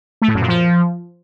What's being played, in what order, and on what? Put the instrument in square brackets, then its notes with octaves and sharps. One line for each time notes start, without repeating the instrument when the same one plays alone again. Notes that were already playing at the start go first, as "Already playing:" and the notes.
[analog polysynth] A3
A2
F#2
A#2
F3